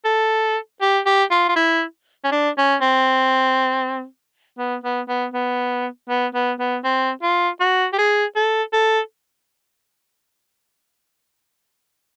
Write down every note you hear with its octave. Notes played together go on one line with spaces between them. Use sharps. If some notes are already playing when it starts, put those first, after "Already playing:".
A4
G4
G4
F4
F4
E4
C#4
D4
C#4
C4
B3
B3
B3
B3
B3
B3
B3
C4
F4
F#4
G4
G#4
A4
A4